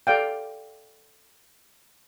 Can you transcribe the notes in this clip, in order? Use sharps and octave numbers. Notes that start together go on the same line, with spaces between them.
A4 D5 F5 G5